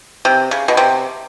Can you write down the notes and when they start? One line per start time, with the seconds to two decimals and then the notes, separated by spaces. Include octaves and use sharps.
0.25 C3
0.51 C#3
0.68 B2
0.77 C3